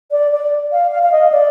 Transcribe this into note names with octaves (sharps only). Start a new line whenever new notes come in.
D5
D5
F5
F5
F5
D#5
D5